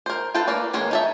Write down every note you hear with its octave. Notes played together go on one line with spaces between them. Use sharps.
A#4 C5
F4 A4 B4 G5
A3 A#3 A#4 B4 D5
D#3 G#3 A#3 C#4
D#4 A4 E5